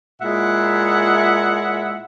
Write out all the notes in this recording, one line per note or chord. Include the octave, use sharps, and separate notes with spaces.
A#2 G#3 E4 E5 F#5